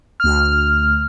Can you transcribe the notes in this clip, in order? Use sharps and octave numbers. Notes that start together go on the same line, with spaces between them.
D2 F6